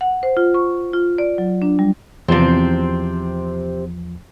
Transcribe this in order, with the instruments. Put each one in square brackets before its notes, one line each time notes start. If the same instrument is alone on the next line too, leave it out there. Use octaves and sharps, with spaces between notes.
[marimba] F#5
C5
F4
C#6
F4
D5
F#3
D4
G3
[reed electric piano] E2 F3 A6 [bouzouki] C3 C4